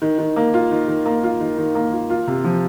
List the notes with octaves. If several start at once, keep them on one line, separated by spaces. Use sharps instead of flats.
D#3
D#3
A#3
F4
D#3
D#3
A#3
F4
D#3
D#3
A#3
F4
F4
C3
F3